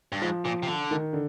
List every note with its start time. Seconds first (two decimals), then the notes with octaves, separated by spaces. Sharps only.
0.12 G2
0.21 G#2 F3
0.45 A#2 F3
0.63 C3
0.68 D3
0.91 D#3
1.13 D3